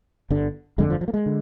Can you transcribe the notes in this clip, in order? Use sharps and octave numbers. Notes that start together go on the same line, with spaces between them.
G1 G2 D3
G1 F2 D3 G#3
F3
F3
A#3
G#3
D3